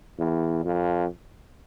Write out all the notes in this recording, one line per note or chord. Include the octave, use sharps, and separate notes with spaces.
E2
F2